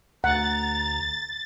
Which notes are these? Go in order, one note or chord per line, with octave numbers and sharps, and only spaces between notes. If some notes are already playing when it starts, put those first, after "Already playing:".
D2 F#5 A#5 A6